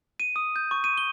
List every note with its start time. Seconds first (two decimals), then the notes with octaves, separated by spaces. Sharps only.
0.20 D#7
0.36 D#6
0.56 G6
0.71 C#6
0.84 D#7
0.98 G7